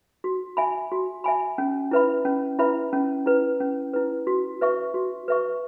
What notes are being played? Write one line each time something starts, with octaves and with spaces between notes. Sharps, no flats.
F#4
E5 G#5 B5
F#4
E5 G#5 B5
C#4
E4 B4 E5 B5
C#4
E4 B4 E5 B5
C#4
E4 B4
C#4
E4 B4
F#4
B4 E5 C#6
F#4
B4 E5 C#6